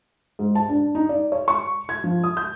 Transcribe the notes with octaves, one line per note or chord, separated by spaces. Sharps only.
G#2
A5
D4
D#4
D5
C#5
C#6
G#6
F3
D#6
G6